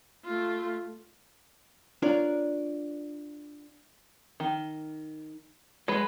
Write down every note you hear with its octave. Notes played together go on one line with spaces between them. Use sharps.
A3 F4
D4 F4 A#4 C#5 D5
D#3
F#3 G#3 B4